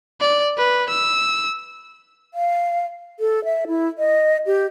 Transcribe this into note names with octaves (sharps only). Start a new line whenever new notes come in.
D5
B4
E6
F5
A4
E5
E4
D#5
G4